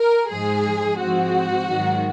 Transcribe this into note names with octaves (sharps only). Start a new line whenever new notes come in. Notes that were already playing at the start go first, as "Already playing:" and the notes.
Already playing: A#4
G#2 F3 G#3 G#4
G#2 F3 G#3 C4 F#4
G#2 D#3 F#3